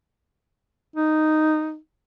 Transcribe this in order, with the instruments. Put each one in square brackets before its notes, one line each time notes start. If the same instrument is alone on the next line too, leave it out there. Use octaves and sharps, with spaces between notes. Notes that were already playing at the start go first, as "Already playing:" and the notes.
[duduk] D#4